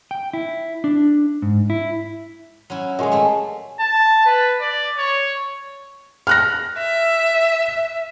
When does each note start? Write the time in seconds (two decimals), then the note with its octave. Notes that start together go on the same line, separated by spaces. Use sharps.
0.11 G5
0.33 E4
0.84 D4
1.42 G#2
1.70 E4
2.70 F#3 C#4 E4
2.99 A#2 G#3 G#4 C#5 D#5
3.12 G3 A3 F#5
3.80 A5
4.26 B4
4.60 D5
4.98 C#5
6.27 F6 F#6 A#6
6.78 E5